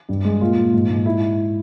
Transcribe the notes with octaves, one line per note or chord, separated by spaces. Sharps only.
G2
G#3
A#2 F4
A#2
G#2
G#2
E4